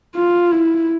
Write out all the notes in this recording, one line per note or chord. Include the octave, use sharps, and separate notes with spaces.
F4
E4